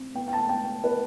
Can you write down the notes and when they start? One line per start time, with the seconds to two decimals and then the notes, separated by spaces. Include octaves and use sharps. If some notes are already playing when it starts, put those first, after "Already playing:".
Already playing: C4
0.14 B3 G5
0.28 G5
0.33 A5
0.49 B3 G5
0.84 B3 B4